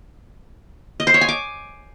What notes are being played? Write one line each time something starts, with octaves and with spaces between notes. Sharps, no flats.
D#5
C5
C#5
G#5
D6